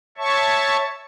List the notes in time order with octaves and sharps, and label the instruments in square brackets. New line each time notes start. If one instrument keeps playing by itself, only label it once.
[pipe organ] C#5 E5 A5 C#6